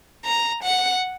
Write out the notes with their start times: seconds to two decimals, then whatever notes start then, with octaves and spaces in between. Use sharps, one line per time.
0.25 A#5
0.63 F#5